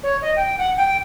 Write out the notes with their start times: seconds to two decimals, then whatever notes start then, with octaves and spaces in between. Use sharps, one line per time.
0.03 C#5
0.22 D#5
0.36 G5
0.58 F#5
0.77 G5